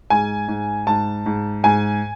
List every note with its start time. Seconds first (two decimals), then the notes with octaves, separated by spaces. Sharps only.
0.10 G#2 G#5
0.48 G#2
0.87 G#2 A5
1.26 G#2
1.64 G#2 G#5